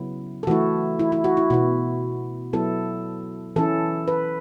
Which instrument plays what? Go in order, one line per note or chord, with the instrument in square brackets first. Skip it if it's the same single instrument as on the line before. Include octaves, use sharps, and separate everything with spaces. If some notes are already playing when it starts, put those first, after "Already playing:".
Already playing: [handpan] C#3 F#3 B3 E4
A4
E3 A3 E4 F#4
E4
E4
F#4
E4
B2 B3 E4 F#4
F#3 B3 E4 A4
E3 C#4 E4 A4
B4